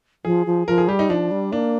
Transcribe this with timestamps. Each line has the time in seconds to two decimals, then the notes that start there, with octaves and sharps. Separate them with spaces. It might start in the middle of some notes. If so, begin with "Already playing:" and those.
0.25 F3 G#4
0.46 F3
0.67 F3 A#4
0.78 G#4
0.88 G3 G4
0.99 D#4
1.09 F3 D4
1.31 G3
1.52 A#3 D4